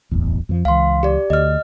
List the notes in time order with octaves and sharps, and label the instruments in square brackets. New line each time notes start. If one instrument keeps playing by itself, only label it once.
[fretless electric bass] D1 G1 E2
F2 F3
[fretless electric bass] C#2 E3 [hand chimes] F5 C6
[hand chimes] G4 D5
[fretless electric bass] D2 [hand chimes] D#5 F6